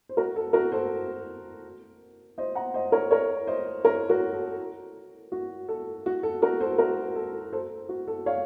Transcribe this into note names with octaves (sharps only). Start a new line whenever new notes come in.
C5
F#4 A#4
A4
F#4 A#4
A4 C5
C5 D#5
F#5 A#5
C5 D#5
A#4 C#5
A#4 C#5
C5 D#5
A#4 C#5
F#4 A#4
A4
F#4
A4
F#4
A4
F#4 A#4
A4 C5
F#4 A#4
A4
A4 C5
F#4
A4
C#5 F5